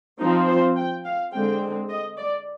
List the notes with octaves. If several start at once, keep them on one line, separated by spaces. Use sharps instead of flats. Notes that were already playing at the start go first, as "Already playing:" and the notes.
F3 C4 D#4
C5
G5
F5
D3 G#3 C4 G5
D#5
D5